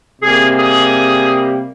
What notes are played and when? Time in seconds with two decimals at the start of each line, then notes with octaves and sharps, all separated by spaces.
0.22 C3 G3 A#3 G#4
0.57 G#4